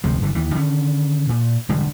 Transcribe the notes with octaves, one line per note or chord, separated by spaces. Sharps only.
F1 D2 C3 F3
F#1 G2 D3 E3
D#2 E3
D3 D#3 C#4
A#2
E1 D3 G3 G#3